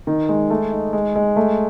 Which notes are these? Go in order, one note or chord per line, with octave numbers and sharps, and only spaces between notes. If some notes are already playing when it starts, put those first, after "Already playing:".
D#3
G#3
A3
D#4
G#3
G#3
A3